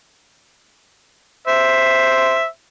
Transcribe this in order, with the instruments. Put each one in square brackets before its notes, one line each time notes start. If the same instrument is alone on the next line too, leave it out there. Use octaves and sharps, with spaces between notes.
[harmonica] C5 E5